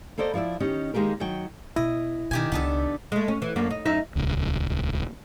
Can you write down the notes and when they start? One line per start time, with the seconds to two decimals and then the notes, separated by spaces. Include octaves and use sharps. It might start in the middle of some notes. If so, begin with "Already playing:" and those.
0.18 A#3 A4 C5 D5 D#5
0.34 F3 E4 C#5 D5 E5
0.60 D#3 C#4 G4 D#5
0.94 D#3 G#3 A#3 G4 A#4
1.20 D#3 F#3 F#4 G5
1.76 B2 E4 D#5
2.31 B2 D#3 G4 G#5
2.52 C#2 C#3 B3 D4 A4
3.12 G#3 A3
3.28 C#4
3.42 E3
3.56 F#2 A#3 D4
3.71 D#4
3.85 F#2 D#4 E5
4.16 D#1 C#2